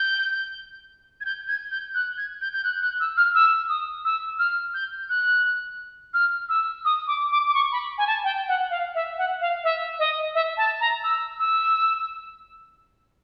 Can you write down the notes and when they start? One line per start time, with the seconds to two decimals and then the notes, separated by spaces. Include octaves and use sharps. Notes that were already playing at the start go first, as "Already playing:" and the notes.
Already playing: G6
1.21 G#6
1.25 G6
1.48 G#6
1.71 G6
1.95 F#6
2.17 G#6
2.41 G6
2.53 G6
2.64 F#6
2.82 F#6
3.00 E6
3.17 F6
3.35 E6
3.69 D#6
4.05 E6
4.39 F6
4.74 G6
5.10 F#6
6.14 F6
6.49 E6
6.85 D#6
7.07 D6
7.32 D6
7.48 D6
7.54 C#6
7.72 B5
7.98 G#5
8.07 A5
8.24 G5
8.48 F#5
8.70 F5
8.95 E5
9.18 F#5
9.41 F5
9.64 E5
9.99 D#5
10.35 E5
10.57 A5
10.80 A#5
11.04 E6
11.39 E6